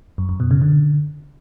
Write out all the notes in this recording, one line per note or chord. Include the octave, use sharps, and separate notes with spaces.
F#2
F#2
B2
C#3
D3